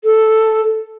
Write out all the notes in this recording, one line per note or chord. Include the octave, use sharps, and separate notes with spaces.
A4